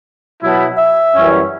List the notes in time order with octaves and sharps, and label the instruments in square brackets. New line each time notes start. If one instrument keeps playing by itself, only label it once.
[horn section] B2 F#3 B3 E4
[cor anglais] E5
[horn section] F#2 E3 G3 C#4